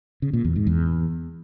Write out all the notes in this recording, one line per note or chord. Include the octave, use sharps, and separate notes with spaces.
C#3
A#2
E2
G#2
E2